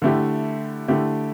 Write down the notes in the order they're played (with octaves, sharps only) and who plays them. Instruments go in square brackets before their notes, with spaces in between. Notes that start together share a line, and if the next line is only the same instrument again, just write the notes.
[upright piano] D3 A3 E4 G4
D3 A3 E4 G4